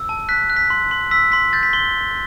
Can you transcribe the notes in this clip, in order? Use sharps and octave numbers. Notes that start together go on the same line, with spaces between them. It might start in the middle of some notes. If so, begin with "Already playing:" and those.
Already playing: E6
A5
F#6 B6
F#6
B6
C6
C6
E6 B6
C6 B6
G6 A6
B6
C6 G7